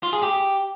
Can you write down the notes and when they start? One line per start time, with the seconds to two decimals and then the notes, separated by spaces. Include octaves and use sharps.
0.03 F4
0.13 G#4
0.23 G4